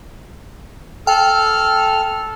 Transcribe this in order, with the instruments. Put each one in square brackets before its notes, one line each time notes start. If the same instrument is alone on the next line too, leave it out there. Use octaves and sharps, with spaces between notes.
[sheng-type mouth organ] A4 F6 [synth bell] G5